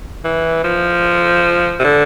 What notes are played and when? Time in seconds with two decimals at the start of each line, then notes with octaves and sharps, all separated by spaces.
0.24 E3
0.64 F3
1.80 C3
1.84 D3